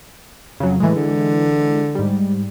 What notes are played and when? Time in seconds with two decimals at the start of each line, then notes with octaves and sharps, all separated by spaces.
0.60 F2 C#3 F#3
0.80 A2 E3 G#3
0.95 D3
1.95 G#2 G3